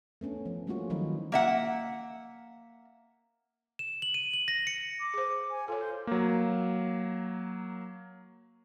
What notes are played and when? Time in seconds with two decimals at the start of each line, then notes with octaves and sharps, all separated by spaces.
0.21 A3 B3 C#4 D4
0.46 F3
0.67 G3 A3 A#3 C#4 F4 F#4
0.90 D#3 F3 F#3 D#4 E4
1.32 A#3 E5 F#5
3.79 E7
4.02 F#7
4.14 D#7
4.34 F#7
4.48 A#6
4.67 C#7
4.99 D6
5.14 G#4 C5
5.50 G#5
5.68 F4 A4 C#5
5.79 C5
6.07 F#3 A#3